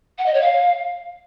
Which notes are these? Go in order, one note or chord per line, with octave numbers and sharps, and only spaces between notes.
F#5
D#5
C#5
F5